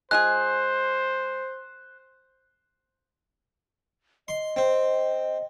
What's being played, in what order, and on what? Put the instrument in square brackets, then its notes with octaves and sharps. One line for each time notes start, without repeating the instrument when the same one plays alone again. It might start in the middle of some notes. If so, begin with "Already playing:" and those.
[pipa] G#3 F4 G#4 [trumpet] C5 [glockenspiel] F#6
[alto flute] D#5 [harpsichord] C6
[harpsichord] C4